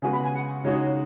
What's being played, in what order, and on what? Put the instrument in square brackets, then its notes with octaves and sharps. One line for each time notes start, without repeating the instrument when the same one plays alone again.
[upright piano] C#3 G#3 B3 F#4 [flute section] G#5
[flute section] B5
G#5
F#5
[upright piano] C#3 G#3 D#4 F#4 [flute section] C#5